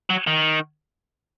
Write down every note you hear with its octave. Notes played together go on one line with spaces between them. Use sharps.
F#3
D#3